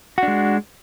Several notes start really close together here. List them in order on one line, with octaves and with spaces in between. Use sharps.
F#4 D4 G#3